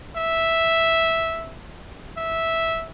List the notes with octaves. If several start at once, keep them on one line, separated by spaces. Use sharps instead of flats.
E5
E5